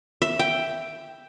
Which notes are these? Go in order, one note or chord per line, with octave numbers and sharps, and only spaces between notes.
E5
G5